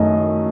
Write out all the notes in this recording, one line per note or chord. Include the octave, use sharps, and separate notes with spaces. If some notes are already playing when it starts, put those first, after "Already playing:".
Already playing: F#2 D#3 A3 D#5